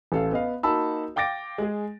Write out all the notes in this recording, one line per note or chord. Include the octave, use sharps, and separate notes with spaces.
A1 A4 F5
B3 D#5 F5
A#3 D#4 F#4 A5 B5 E6
F5 G5 D6 A6 A#6 D7
G#3 G#4